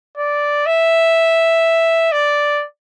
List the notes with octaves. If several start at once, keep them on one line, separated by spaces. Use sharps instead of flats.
D5
E5
D5